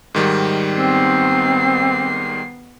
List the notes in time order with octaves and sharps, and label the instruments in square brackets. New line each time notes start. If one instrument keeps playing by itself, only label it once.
[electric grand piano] G#2 D#3 G3
[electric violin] B3 C7 [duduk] C4